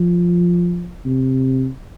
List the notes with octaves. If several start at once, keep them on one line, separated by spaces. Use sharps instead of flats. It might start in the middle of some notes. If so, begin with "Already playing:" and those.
Already playing: F3
C3